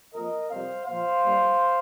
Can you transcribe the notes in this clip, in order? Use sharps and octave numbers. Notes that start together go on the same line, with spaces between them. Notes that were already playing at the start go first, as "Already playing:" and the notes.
F2 F3 A#3 A#4 D#5
F2 C3 G3 C4 C5 F5
A#2 F3 A#3 C5 F5
G2 G3 A#3